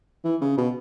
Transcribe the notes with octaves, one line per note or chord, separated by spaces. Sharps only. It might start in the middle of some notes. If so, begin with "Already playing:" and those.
E3
C#3
B2